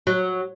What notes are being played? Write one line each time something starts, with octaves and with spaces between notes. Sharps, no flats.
F#3